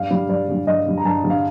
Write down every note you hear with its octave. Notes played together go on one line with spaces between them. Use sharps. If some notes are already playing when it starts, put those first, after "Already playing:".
Already playing: G2 F5
D3 G3
G2 D5
D3 G3
G2 D#5
D3 G3
A#5
G2 A5
D3 G3
F5